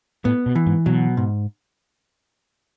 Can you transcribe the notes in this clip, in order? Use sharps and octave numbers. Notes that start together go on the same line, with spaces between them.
A2 B3
B2
E3
G#2
B2 F#3
G#2